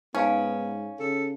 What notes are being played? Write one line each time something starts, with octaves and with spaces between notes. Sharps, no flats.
G#2 B3 C#4 D#4 F5 G#5
C#3 A4